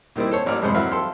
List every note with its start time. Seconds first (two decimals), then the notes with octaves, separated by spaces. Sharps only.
0.16 A#2 D#3 G3 C4 E4
0.32 A4 C5 C#5
0.46 A1 A#3 A#4 D5 F6
0.62 F2 G#2 C3 G3 C5 B5
0.74 E3 F#3 C4 E5 F5 B5
0.92 A4 G5 C6